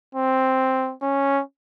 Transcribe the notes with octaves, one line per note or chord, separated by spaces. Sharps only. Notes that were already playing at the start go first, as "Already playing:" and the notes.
C4
C#4